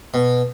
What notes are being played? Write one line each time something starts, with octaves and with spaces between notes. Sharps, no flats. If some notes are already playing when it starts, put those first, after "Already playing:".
B2